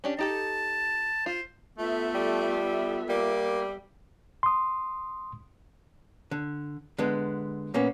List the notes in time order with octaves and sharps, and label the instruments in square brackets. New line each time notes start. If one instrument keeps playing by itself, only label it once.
[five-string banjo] C#4 D4 G4
[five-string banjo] D#4 G4 A4 [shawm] A5
[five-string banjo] F4 [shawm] C5
[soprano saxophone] A3 [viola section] B3 A4 E5 [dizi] F4
[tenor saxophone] G3
[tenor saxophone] G3 [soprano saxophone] A#3
[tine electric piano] C6 D#6
[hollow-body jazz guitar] D3
D3 G#3 B3
A#2 A#3 B3 C#4